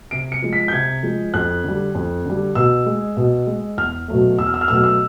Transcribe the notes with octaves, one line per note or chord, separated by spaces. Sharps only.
C3 D7
C#7
F3 G#3
B6
G6
C3 G#6
F3 G#3
F2 F#6
D3 G3
F2
D3 G3
B2 E6
G#3
B2
G#3
E2 F6
B2 F#3 A3
E2 E6
F6
E6
F6
B2 F#3 A3 E6
F6
E6